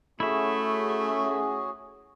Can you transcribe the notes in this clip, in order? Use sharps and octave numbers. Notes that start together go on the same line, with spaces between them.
A3 C#4 E4 F#4 G#4 E5